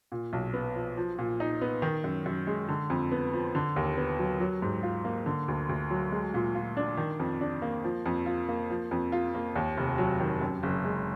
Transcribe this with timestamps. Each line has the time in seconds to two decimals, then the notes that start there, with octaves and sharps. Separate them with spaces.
0.12 A#2
0.33 B1
0.54 B3
0.76 F3
0.97 F3
1.18 A#2
1.40 D#4
1.61 B3
1.82 D#3
2.04 F#2
2.26 F#2
2.47 G#3
2.69 D3
2.90 F2
3.12 B3
3.33 F3
3.55 D3
3.76 D#2
3.98 B3
4.19 F#3
4.40 F#3
4.62 G#2
4.83 F4
5.05 A#3
5.26 D3
5.48 D2
5.69 D2
5.90 F#3
6.12 G#3
6.34 A#2
6.55 F4
6.77 D4
6.97 D#3
7.20 F2
7.41 D4
7.62 A#3
7.84 F3
8.06 F2
8.26 F4
8.49 A#3
8.70 F3
8.91 F2
9.12 F4
9.35 A#3
9.55 D#2
9.77 F1
9.98 F#3
10.20 D#3
10.41 F#2
10.63 F#1
10.84 G#3